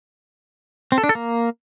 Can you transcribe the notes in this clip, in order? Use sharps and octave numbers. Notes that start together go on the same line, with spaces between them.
C4
A4
D4
A4
A#3